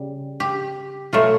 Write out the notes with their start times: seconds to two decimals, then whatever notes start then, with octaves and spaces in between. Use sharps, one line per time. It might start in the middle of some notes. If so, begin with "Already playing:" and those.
Already playing: C#3 G3
0.40 G4
1.13 B2 F#3 A3 F4